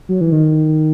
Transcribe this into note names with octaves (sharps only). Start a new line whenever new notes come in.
F#3
E3
D#3